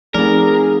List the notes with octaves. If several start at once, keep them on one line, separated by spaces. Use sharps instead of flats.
F3 A3 C4 D#4 G#4 A#4 D5